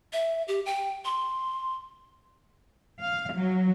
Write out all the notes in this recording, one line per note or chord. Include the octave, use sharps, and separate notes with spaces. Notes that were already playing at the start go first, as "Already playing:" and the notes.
E5
G4
G5
C6
F5
F#3